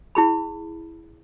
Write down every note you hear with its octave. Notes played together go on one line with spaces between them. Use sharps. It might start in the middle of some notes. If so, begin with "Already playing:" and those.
E4 G#4 B5